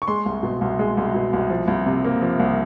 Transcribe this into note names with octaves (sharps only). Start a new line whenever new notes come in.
C#6
G#3 C6
C2
B2
C2
G#3
C2
B2
C2
F3
C2
C3
A#3
F3
C2